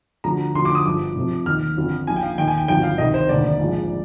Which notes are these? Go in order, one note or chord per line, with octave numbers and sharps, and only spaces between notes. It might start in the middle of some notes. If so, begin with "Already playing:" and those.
D2 D3 F3 A#5
D2 D3 F3 C6
D6
D#6
G1 G2 F3 D6
F1 F2 C3 F3
D#2 D#3 F6
G1 F2 D3 F3
A#1 A#2 F3 G#5
G5
F5
D#2 D#3 G5
G#5
G5
G#1 G2 D3 F3 G5
F5
C2 C3 D#3 D#5
C5
F1 D#2 D3 D5
A#1 G#2 F3